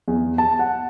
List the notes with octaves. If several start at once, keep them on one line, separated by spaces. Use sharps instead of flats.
E2
A5
F#5